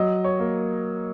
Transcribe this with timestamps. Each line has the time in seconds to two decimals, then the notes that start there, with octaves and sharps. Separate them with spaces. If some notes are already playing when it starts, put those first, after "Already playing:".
Already playing: F#3 D#5
0.24 C#5
0.39 A#3